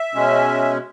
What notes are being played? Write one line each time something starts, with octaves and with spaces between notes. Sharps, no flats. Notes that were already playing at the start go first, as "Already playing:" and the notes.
Already playing: E5
B2 G#3 C#4